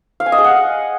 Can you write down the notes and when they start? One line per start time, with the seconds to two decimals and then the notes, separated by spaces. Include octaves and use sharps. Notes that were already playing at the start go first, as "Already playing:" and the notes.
0.20 F5
0.26 G#5
0.32 D#5
0.38 G#4
0.44 F#5